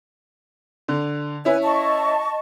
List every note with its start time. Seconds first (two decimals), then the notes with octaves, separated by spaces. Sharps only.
0.88 D3
1.45 C#4 E4 B4 G#5
1.63 D#5 A5 C#6